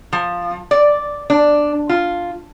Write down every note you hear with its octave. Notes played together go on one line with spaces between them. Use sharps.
F3
D5
D4
F4